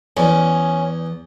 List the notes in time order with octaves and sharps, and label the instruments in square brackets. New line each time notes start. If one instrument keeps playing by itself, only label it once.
[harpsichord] E2 [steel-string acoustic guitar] C#4